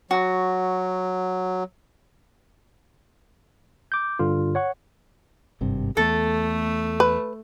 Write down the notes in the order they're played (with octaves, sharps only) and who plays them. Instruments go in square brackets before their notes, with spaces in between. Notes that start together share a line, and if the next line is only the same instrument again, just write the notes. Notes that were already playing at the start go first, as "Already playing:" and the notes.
[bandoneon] F#3 [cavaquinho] F#4
[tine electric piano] D6 G6
G2 D3 F4
C#5 F#5 C#6
[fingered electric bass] G#1 G2 C3
[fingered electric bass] E2 [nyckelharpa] A3 [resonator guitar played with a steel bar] A4
[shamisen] B4